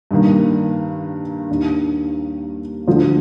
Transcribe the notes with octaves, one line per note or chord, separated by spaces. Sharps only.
G2 D#3 A#3
D#2 D#3 A#3 D4
D2 D3 F3